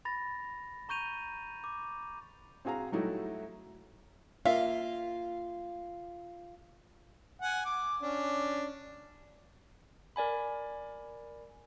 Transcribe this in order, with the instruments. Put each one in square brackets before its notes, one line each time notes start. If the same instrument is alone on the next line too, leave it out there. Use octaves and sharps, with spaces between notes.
[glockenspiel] B5 A6 A#6
A#5 C#6 G6 D#7 F7
D6
[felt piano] C4 F#4 G#4 F5 A#5
F#3 G3 A3 D#4 E4 F#4
[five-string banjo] A#3 E5 F5 [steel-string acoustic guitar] F4
[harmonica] F#5 G#5
D6
C#4 D4
[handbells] A#4 D5 G#5 B5